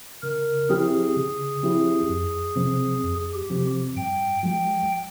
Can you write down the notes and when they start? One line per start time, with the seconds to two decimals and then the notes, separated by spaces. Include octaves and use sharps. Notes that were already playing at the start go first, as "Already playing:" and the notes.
0.23 C#3 A#4
0.69 F3 C4 E4 G4 G#4
1.17 C#3
1.63 F3 C4 E4 G4
2.09 F2
2.56 C3 F3 C4
3.03 F2
3.34 G4
3.50 C3 F3 C4
3.96 G2 G5
4.43 F3 G#3 G5